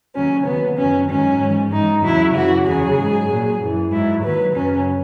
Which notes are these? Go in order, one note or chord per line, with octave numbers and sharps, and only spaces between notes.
D#2 C#3 F#3 C#4
D#2 C#3 F#3 B3
F#2 D#3 F#3 C#4
G#2 D#3 F#3 C#4
G#2 E3
G#2 E3 D#4
E2 C#3 F#3 E4
F#2 C#3 E3 F#4
E2 C#3 F#3 G#4
G#2 F#3
A#2 F#3
F#2 E3
G#2 F#3 E4
D#2 D#3 F#3 B4
F#2 C#3 F#3 C#4